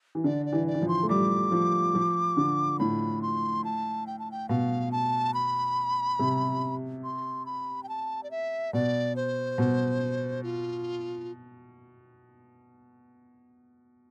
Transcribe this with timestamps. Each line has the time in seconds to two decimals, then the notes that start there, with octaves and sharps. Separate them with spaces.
0.15 E3
0.24 D3 D5
0.46 D5
0.52 E3
0.67 D5
0.74 E3
0.82 F3
0.88 C6
1.03 A3
1.09 G3 D6
1.52 F3
1.95 F3
2.37 D3
2.79 A2 B5
3.22 C6
3.64 A5
4.07 G5
4.19 A5
4.31 G5
4.49 B2 F5
4.92 A5
5.34 B5
6.19 C3
7.04 C6
7.46 B5
7.83 G5
7.89 A5
8.23 D5
8.31 E5
8.73 B2 D5
9.16 C5
9.58 B2
10.44 F4